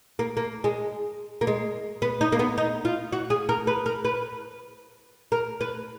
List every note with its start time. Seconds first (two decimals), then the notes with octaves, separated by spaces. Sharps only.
0.19 A#3
0.37 A#3
0.64 G#3
1.41 A#3
1.47 G#3
2.02 B3
2.21 D#4
2.32 A#3
2.39 B3
2.58 D#4
2.85 F4
3.12 F#4
3.30 G#4
3.49 A#4
3.67 B4
3.86 A#4
4.05 B4
5.32 A#4
5.61 B4